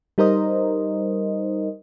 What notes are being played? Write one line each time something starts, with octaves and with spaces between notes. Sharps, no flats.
G3 D#4 A#4 C5 D#5